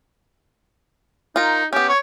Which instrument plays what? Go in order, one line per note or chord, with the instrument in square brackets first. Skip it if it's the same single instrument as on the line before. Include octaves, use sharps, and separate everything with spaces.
[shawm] D#4 [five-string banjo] F4 A#4
[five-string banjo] B3 C#4 [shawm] G4
[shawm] C#5